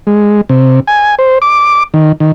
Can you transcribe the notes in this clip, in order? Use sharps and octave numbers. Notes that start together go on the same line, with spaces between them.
G#3
C3
G#5
C5
D6
D#3
D#3